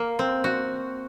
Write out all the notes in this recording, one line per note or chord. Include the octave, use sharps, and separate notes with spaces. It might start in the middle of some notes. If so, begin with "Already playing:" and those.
Already playing: A#3
C4
F#4